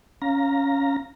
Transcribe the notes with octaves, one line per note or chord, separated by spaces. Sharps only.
C#4 F5 A#5 A#6